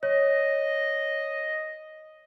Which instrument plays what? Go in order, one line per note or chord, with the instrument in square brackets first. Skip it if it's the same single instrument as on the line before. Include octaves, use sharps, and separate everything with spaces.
[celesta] C#5 [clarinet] D#5